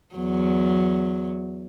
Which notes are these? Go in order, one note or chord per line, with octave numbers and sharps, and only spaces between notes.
E2 F#3